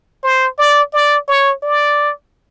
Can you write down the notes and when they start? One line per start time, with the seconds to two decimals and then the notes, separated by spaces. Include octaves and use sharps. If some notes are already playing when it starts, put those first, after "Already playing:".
0.23 C5
0.58 D5
0.93 D5
1.28 C#5
1.63 D5